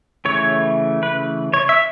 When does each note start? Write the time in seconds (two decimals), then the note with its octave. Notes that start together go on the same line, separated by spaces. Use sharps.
0.25 C#3 E3 A3 C#5
1.03 B4
1.54 C#5
1.69 E5